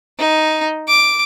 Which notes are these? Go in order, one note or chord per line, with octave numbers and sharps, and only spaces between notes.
D#4
D6